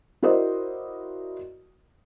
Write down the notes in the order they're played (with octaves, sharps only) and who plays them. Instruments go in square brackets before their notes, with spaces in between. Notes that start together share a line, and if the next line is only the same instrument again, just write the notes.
[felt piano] E4 F#4 A#4 C5 D5 D#5